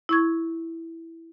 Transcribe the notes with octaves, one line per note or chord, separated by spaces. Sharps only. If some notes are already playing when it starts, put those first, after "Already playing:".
E4 C#6 G#6